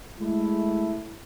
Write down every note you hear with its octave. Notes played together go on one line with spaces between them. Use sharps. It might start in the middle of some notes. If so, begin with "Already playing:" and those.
G#3 A3 E4